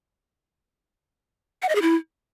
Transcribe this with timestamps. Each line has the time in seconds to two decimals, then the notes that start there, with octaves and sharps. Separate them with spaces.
1.62 F#5
1.69 D#5
1.75 G#4
1.82 E4